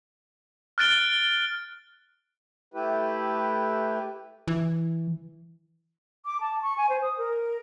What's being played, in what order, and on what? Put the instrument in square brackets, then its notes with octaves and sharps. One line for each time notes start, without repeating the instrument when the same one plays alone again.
[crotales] F6 F#6 A6 D7 G7
[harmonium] A3 E4 G4 B4
[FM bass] E3
[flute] D6
A5
C#6
G#5
C5
D#6
A#4